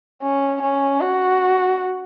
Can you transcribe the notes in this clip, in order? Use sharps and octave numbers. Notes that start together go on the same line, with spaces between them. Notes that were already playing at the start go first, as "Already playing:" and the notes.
C#4
C#4
F#4